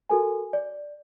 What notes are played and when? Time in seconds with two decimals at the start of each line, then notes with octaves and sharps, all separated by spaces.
0.10 F#4 A4 A#4 G#5
0.53 D5